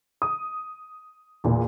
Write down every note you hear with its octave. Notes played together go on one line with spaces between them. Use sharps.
D#6
E2 A#2